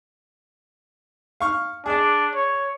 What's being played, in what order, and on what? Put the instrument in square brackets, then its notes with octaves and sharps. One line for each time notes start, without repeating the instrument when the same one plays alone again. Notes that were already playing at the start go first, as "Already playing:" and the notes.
[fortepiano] F5 C#6 F6
[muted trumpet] D4 [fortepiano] G#4 D5
[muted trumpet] C#5